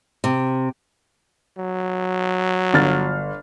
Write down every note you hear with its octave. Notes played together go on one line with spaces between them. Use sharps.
C3
F#3
G1 F6 A6